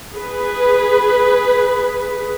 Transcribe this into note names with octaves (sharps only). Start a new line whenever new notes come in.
G#4 B4